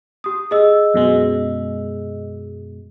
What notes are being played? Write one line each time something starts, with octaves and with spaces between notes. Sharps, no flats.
G4 D#6
G#4 D#5 E6
F#2 B2 G#3